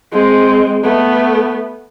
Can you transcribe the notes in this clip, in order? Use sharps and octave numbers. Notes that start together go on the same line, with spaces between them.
G#3 C4
A3 B3